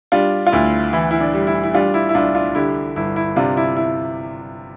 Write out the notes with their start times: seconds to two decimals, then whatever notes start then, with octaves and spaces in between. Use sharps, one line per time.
0.12 G3 D4 F4
0.47 F4
0.52 D2 E4
0.93 E3 E4
1.11 E4
1.20 D4
1.34 G3
1.47 E4
1.63 E4
1.74 G3 D4 F4
1.94 E4
2.09 E4
2.15 C2 D4 F4
2.35 D4 F4
2.55 D3 E4 G4
2.96 G1 E4
3.16 E4
3.36 C3 D4 F4
3.57 E4
3.77 E4